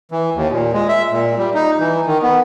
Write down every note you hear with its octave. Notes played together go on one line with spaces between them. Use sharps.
E3
D#2
A#2
G#3
E5
A#2
G3
D#4
E3
D#3
B3